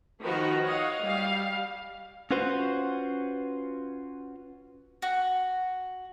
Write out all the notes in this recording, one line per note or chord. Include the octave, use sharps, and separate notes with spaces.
D#3 F3 F#4 B4
C#5 D#5 F5 F#5
G3 F5
C#4 F4 F#4 B4 C5
F#4